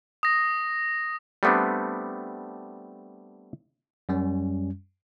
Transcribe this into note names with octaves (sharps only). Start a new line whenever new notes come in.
D#6 A#6
G3 A3 B3 C4 D4
F#2 G3 C#4